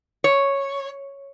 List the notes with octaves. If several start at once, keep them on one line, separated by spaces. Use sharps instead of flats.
C#5